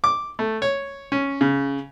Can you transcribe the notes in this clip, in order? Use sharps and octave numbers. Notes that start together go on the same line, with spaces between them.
D6
A3
C#5
C#4
C#3